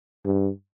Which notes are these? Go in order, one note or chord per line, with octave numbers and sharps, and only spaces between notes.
G2